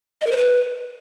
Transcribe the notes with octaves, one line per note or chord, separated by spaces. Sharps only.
D#5
A#4
C5
B4